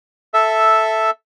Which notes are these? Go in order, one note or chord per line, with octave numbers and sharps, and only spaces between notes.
A4 E5